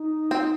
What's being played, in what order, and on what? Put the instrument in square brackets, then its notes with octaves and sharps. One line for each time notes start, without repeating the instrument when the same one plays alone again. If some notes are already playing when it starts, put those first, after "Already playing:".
Already playing: [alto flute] D#4
[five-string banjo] C4